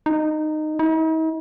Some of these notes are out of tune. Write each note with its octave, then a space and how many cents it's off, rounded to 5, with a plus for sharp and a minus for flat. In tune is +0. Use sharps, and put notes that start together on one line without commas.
D#4 -15
D#4 +45